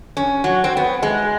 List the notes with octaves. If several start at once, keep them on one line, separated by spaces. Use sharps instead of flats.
C#4
F#3
C4
B3
G#3